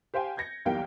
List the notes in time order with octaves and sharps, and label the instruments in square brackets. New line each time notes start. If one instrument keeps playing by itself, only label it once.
[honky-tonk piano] G4 C5 F5 G5 G#5
G6 G#6 A#6 C#7
B1 E2 G3 A#3 F5 G5